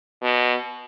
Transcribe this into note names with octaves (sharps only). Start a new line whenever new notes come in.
B2